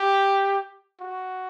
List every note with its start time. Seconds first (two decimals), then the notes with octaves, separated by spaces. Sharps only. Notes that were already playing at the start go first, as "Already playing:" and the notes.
Already playing: G4
1.01 F#4